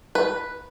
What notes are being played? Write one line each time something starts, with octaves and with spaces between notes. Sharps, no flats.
B4